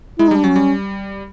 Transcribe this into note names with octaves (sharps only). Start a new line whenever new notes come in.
G#3 E4
D#4
G3 D4
F#3 C#4
G3